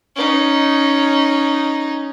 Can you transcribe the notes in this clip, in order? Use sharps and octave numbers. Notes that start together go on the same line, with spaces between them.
C#4 D#4